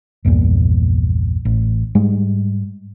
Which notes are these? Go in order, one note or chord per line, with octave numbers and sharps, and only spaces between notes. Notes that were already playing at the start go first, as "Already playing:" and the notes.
A#1 E2 G2 A#2
A1
G#2 G3 G#3